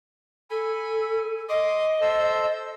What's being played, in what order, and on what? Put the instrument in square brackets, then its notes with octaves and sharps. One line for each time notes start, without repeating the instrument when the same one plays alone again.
[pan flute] A4 [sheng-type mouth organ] G#5 B5
[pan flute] D#5 [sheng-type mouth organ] C6 D6 D#6
[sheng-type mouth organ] A4 C5 E6